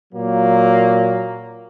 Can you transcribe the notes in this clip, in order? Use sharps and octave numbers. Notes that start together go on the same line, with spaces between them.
A#2 F#3 A#3